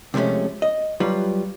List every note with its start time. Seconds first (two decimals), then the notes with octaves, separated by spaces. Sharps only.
0.14 C3 F3 G#3 A3 C#4
0.62 D#5
1.00 F#3 G3 F4 B4